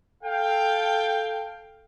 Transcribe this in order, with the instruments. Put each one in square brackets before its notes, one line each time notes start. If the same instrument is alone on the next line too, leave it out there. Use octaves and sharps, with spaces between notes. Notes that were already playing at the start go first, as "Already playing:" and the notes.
[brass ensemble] A4 F5 G5